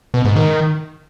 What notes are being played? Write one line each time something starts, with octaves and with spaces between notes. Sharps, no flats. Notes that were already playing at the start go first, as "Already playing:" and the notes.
B2
G#2
D#3